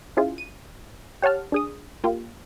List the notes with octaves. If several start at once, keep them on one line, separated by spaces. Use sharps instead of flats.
C#4 E4 F4 G#4
D#7
G4 C#5 F#5 A5 F6
D4 G#4 D#6
A#3 F4 G4